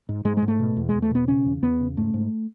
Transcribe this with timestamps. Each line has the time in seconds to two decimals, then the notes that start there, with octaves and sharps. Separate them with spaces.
0.09 G#2
0.25 G#2 G#3
0.37 G#3
0.42 G#2
0.48 A3
0.59 B2
0.77 E2
0.89 G#3
0.94 E2
1.02 A3
1.11 B2 B3
1.28 C#3 C#4
1.45 E2
1.63 E2 B3
1.80 C#3
1.97 G#2 A3
2.14 G#2